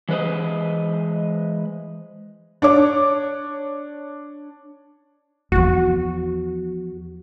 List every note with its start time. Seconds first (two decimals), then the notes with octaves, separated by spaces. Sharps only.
0.09 E3 G#3 B4 C5 D#5
2.62 D4 C#5 D6
5.52 E2 F3 F#4